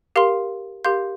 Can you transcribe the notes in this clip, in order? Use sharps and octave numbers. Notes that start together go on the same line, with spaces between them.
G4 A#4 F5 C6
G4 A#4 F5 C6 G6